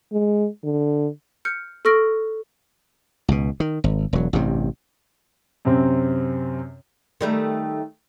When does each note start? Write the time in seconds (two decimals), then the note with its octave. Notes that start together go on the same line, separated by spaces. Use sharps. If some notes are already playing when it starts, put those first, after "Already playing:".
0.12 G#3
0.64 D3
1.45 F6 G6 C#7
1.85 A4 C#6 F6 A#6 D7
3.28 C#2 B2
3.60 D#3
3.84 G#1
4.13 E1 F#3
4.33 A1 G2 C3
5.65 F#2 C3 C4
7.21 D#3 G3 A3